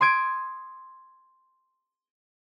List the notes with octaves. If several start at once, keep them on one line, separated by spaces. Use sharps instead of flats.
C6 D#6 G#6 D7